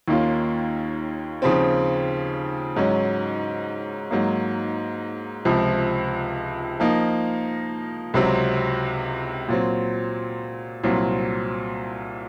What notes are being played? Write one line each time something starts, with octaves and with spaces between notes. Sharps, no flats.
D#2 D#3 A#3 C#4 F4
D#2 C#3 F3 C4
G#2 F#3 C#4
G#2 F#3 A#3
C#2 C3 F3
F3 A#3 D#4
C#2 C3 F#3 C4
A#2 F#3 C4
C2 A#2 F#3 C4